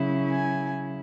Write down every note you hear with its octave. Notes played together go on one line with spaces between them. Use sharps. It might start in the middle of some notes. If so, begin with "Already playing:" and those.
Already playing: C#3 F#3 C#4 E4
G#5